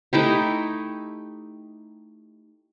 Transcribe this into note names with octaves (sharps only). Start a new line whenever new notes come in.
A3 D#4 E4 G4